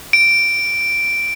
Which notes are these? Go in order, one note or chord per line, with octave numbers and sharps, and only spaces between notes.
D7